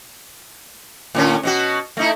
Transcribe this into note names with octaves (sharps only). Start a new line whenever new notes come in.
A2 D3 C#4
B2 B3 F#4
A3 D#4 E4